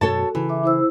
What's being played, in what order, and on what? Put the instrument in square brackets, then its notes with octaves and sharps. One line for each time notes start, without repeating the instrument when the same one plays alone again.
[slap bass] F#2 B2 [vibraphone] F#4 [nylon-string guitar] A4 C#5 A5
[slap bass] C#3 [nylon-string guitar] E3
[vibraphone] E5 D6
E4 C5 E6